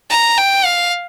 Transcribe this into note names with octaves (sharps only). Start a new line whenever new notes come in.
A#5
G5
F5